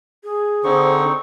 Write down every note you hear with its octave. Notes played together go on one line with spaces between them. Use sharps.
G#4
D3 C4 D#4 C5 C#6